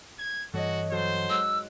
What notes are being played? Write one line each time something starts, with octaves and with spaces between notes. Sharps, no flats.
G#6
G2 E3 G3 F#4 A4 C#5 D#5
F#3 A4 C5
G#2 E6 F#6